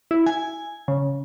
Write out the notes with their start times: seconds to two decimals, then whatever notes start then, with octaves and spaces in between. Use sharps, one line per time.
0.11 E4
0.26 G#5
0.88 C#3